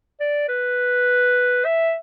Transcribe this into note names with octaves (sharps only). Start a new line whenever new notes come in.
D5
B4
E5